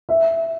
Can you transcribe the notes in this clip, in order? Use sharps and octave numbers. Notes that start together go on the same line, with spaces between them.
E5